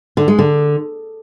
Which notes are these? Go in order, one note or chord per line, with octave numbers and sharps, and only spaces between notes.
D3
G#3
D3